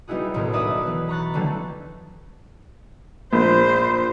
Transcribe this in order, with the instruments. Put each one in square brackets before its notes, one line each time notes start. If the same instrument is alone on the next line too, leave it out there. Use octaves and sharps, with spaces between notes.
[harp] G3 B3 D#4 E4 F#4 G#4
D#1 B1 A2 A#4
B3 D#4 B4 D5 E5 D#6
E3 B4
A#5 B5 C#6 F#6 A6
D3 E3 F#3 G3 A3 D4
[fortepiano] A#1 [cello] C5